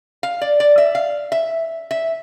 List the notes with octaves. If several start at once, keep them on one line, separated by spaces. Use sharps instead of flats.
F5
D5
D5
E5
F5
E5
E5